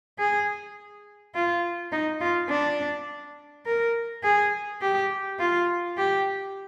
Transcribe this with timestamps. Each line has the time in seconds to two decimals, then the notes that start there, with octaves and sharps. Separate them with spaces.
0.19 G#4
1.35 F4
1.92 D#4
2.21 F4
2.49 D4
3.66 A#4
4.23 G#4
4.81 G4
5.39 F4
5.98 G4